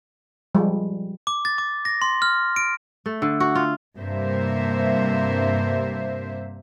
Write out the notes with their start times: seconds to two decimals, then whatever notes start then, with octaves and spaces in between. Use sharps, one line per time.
0.55 F3 G3 G#3
1.27 D6
1.45 A6
1.58 D6
1.85 A#6
2.02 C6
2.22 F6
2.56 D7
3.06 A3
3.22 D3
3.40 F#4
3.55 F4
3.96 G2 C3 A#3 C5 E5